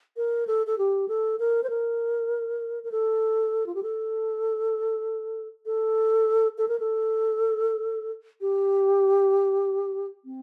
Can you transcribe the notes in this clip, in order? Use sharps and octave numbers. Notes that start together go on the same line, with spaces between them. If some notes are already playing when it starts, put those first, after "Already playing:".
A#4
A4
A4
G4
A4
A#4
C5
A#4
A#4
A4
F4
G4
A4
A4
A4
A#4
A4
G4
C4